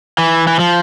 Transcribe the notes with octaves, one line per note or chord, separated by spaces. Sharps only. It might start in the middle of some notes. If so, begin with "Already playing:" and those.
E3
E3
F3